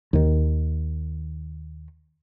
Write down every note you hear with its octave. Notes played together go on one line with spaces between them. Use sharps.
D#2 D#3